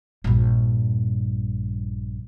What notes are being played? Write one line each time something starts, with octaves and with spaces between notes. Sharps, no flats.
A#1 G2